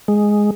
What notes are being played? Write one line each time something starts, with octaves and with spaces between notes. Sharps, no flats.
G#3